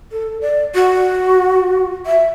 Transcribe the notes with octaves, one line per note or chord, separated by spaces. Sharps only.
A4
D5
F#4
E5